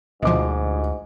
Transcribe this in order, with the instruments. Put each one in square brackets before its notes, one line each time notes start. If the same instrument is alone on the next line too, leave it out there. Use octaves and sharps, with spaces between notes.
[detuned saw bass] D2 [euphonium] G#2 [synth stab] B2 F3 [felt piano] D#5 D6